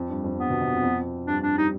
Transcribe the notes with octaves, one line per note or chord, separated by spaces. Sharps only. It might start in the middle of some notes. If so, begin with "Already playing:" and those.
Already playing: F2
G2
F2
G2 B3
B2
C3
F2
F2
G2 D4
D4
G3 D#4